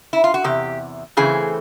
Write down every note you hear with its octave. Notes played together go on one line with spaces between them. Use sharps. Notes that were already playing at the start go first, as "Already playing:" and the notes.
E4
F4
F#4
E2 C3 G4
C#3 E3 A3 C4 G#4